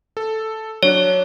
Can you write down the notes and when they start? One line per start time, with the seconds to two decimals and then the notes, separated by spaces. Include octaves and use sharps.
0.17 A4
0.83 F#3 D4 C#5